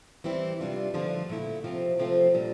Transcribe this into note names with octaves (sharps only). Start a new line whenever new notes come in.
E3 G3 C4 E4
C3 G3 D4 F4
D3 F3 A3 D4 F4
A#2 A3 E4
C3 F3 C4 F4
C3 F3 A3 C4 F4
A#2 G3 D4